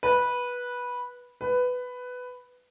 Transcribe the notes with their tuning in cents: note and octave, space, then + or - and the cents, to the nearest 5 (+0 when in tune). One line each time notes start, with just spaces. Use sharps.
B4 -15
B4 +10